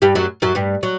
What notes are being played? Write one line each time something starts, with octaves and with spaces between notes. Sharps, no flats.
G2 G3
F#2 F#3
F#2 F#3
G2 G3
F#3